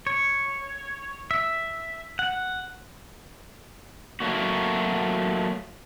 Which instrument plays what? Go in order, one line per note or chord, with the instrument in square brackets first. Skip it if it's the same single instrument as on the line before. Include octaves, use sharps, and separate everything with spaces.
[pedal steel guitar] C#5
E5
F#5
[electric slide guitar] F#3 A3 A#3 F#4